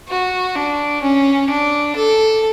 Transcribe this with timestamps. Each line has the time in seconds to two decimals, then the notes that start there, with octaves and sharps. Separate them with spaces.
0.09 F#4
0.56 D4
1.02 C#4
1.49 D4
1.96 A4